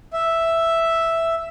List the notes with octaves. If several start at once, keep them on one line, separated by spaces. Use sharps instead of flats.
E5